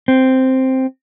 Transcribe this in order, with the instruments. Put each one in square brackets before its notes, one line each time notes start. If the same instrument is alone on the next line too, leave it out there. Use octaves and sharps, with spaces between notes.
[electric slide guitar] C4